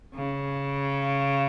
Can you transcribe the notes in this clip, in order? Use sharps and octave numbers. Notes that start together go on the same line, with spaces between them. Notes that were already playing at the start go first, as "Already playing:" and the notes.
C#3